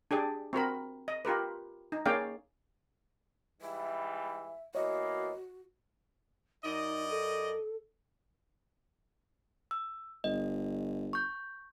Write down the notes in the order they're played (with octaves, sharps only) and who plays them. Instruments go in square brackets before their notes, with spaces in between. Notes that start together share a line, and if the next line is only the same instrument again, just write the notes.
[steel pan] D4 G4 G#4 D5
C4 F#4 A#4 B5
D#5
F4 G4 A#4 B4
D#4
A#3 C#4 G#4 D5 F5 G5
[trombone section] G#2 E3 G3 [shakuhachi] E5
[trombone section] E3 A#3 B3 [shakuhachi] F#4 [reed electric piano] C#5 D#5
[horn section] F#2 D5 D#5 [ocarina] D#4
[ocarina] A4
[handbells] E6
[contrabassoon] G1 [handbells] D#5
[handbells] C#6 G6